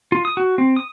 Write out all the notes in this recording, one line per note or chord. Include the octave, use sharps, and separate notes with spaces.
F4
D#6
F#4
C4
D#6